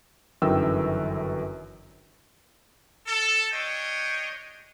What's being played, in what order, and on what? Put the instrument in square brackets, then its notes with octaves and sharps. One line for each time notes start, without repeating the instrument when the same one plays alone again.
[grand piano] G1 F#2 D#3 E3 G5 E6
[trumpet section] A4
D4 C#5 D#5 G5